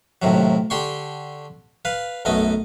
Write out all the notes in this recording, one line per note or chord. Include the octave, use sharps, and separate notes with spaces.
D#2 A2 C3 F#3
D3 G4 G5 C6 C#6
B4 F5
B1 F#2 A3 B3 D#5